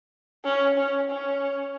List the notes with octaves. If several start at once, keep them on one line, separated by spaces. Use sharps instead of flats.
C#4
C#4
C#4